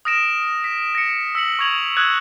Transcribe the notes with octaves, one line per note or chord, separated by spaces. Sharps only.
D#6 F6 A#6 D7 E7
B6
A#6 C#7
E6 B6 C#7 F#7
C#6 E6 G#6 F7 F#7
D#6 E6 F#6 G#6